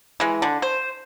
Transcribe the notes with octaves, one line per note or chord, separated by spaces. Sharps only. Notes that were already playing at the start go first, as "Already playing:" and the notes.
E3 G#3
D3
C5